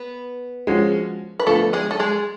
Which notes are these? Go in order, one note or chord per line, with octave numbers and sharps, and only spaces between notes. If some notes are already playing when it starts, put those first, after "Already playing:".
Already playing: B3 B4
F3 G#3 C#4 F#4
B4
D3 F3 A3 B3 D4 F4 A4
G#3 G#4
A4
G#3 G#4